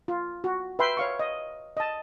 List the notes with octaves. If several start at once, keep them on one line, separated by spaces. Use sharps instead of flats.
F4
F#4
B4 E5 G5 B5 C6
C#5 F5 C#6
D#5
D#5 A5